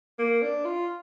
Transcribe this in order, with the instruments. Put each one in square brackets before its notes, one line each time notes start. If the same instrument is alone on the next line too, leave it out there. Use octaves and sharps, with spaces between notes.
[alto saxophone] A#3
D4
F4